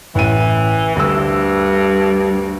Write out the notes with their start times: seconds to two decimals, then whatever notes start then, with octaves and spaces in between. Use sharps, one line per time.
0.15 A1 E3 D#7
0.96 D2 G2 E6